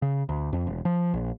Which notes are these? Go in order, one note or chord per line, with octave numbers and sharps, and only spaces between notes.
C#3
D2
F2
E1
F3
A#1